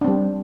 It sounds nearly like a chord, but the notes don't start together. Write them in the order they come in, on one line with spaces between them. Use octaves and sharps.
D4 C4 G3